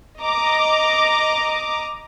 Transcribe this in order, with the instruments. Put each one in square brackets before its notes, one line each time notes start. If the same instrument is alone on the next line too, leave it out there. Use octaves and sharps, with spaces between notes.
[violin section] D#5 A#5 D6